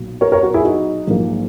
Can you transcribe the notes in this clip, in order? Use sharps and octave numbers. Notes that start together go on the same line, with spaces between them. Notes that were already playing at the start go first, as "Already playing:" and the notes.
Already playing: B1 A#2 F#3
A#4 C#5
A#4 C#5
F#4 A#4
E4 G#4
D#4 F#4
A#1 G#2 F#3 A#3